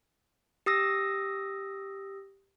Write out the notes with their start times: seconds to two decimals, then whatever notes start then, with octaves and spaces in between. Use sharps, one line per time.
0.66 G4 D#6 E6 A#6